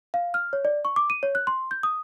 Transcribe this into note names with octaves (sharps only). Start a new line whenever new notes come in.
F5
F6
C#5
D5
C#6
D6
D#7
C#5
F#6
C6
G6
D#6